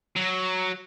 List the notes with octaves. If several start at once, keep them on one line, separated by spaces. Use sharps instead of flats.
F#3